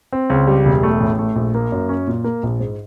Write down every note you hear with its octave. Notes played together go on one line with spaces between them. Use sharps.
C4
C#2
G3
E1
A3
A1
A3
A#1
A#3
F#2
C#4
A#2
A#3
A#1
G#2